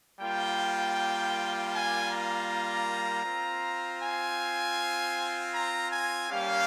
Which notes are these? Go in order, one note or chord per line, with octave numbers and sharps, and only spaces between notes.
G3 A#3 F4 G5
G#5
A#5
C4 F4
G#5
A#5
G#5
G3 A#3 C#4 G4 F5